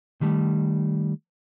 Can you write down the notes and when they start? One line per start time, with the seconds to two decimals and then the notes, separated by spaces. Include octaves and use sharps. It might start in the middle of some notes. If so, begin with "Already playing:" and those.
0.21 D#3 G3 A3